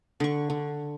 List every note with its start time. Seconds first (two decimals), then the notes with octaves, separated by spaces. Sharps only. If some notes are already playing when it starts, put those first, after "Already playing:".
0.20 D3 C#6
0.50 D3